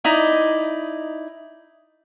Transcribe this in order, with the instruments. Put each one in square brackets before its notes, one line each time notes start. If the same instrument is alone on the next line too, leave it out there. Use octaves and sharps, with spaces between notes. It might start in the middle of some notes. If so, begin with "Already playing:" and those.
[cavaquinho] D#4 E4 D5 D#5